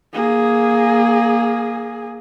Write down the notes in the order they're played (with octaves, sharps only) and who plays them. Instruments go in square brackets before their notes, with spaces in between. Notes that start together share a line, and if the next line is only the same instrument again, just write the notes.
[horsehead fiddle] A#3 G#4